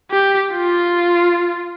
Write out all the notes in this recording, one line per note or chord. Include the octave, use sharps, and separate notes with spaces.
G4
F4